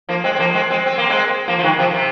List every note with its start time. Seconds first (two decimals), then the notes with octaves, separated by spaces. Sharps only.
0.09 F3 A#3
0.24 G#3 C4
0.35 C4
0.39 F3 A#3
0.54 G#3 C4
0.70 G#3 C4
0.86 C4
0.98 A#3
1.10 G#3 C4
1.48 F3 A#3
1.59 F3
1.63 D#3 G#3
1.79 C3 F3
1.94 C3